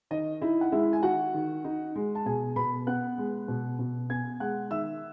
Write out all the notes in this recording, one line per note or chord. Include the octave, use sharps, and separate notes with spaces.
D#3 D#5
D#4 E4 E5
F#5
G#3 E4 E5
G#5
D#3 F#4 F#5
D#3
D#4
G#3
A5
B2 G#4 G#5
B2 B4 B5
B3 F#5 F#6
G#3
B2
B2
B3 G#5 G#6
G#3 F#5 F#6
D#3 E5 E6